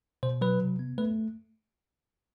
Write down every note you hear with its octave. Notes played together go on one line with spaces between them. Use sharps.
B2 C5
F#3 B4
C3
B3
A3 B4